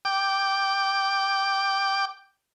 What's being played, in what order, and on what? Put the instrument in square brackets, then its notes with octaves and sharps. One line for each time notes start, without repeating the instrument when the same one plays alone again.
[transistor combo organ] G5 D6